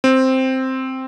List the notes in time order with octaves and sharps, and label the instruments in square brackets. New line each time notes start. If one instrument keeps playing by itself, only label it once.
[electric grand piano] C4